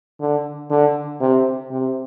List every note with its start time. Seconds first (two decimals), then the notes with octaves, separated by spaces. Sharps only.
0.21 D3
0.70 D3
1.20 C3
1.71 C3